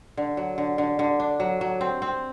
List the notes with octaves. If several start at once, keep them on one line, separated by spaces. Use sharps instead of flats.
D3
F#3
D3
D3
D3
D4
F#3
F#3
C4
C4